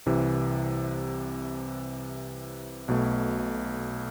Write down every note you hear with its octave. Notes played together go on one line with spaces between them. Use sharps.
C2 C3 E3
B1 B2 A3